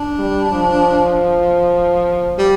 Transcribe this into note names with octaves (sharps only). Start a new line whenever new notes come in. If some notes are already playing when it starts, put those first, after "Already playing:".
Already playing: D4
G3
F3
G3